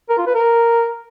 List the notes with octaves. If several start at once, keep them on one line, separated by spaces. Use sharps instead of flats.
A#4
F4
B4
A#4